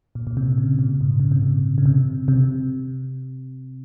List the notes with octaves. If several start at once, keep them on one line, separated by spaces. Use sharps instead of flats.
A#2
A#2
C3
C#3
A#2
G#2
C#3
C3
A#2
C#3
C3
C3